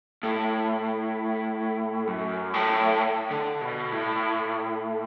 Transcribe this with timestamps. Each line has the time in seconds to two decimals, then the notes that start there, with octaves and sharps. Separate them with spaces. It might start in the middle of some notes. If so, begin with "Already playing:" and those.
0.23 A2
2.07 F#2
2.54 A2
3.31 D3
3.61 B2
3.92 A2